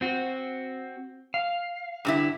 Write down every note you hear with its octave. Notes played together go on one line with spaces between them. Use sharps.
C4 F#4
F5
G2 D3 E4